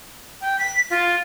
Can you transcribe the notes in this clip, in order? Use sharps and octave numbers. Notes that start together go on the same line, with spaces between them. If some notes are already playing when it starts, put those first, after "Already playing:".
G5
B6
F4